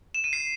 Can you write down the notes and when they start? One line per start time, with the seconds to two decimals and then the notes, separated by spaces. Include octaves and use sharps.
0.14 E7
0.24 D#7
0.33 C7